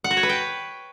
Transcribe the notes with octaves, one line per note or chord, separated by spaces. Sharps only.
F#5
F#4
C#5
B4
G5